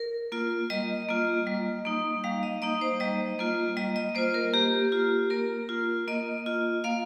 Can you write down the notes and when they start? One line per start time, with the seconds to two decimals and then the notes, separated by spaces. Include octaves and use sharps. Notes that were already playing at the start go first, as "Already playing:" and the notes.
Already playing: A#4
0.32 A#3 F4
0.70 G3 D#5
1.09 A#3 F4
1.47 G3
1.85 A#3 D#4
2.24 G3 F5
2.43 D#5
2.62 A#3 D#4 D#5
2.81 C5
3.00 G3 D#5
3.39 A#3 F4
3.77 G3 D#5
3.96 D#5
4.15 A#3 F4 C5
4.34 A#4
4.53 A#3 G4
4.92 F4
5.30 A#3 A#4
5.69 F4
6.08 A#3 D#5
6.46 F4
6.84 A#3 F5